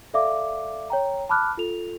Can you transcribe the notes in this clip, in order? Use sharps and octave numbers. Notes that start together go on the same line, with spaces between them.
A4 D5 E5 F5 D6
C#5 G5 A#5
A5 B5 D6 F6 F#6
F4 A4 F7